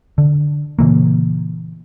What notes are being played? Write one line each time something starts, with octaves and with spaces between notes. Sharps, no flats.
D3
A#2 C#3 E3 A#3